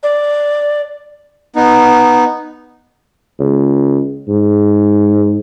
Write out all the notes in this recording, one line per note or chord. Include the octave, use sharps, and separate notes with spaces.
D5
B3 D#4
C#2
G#2